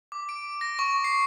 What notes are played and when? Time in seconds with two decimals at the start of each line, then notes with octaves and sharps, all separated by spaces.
0.12 D6
0.29 D7
0.61 A#6
0.79 C#6
1.04 C7